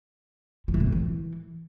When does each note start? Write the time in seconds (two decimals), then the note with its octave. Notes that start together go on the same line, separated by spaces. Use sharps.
0.68 F3
0.74 E3
0.80 B2
0.86 A2
0.92 E3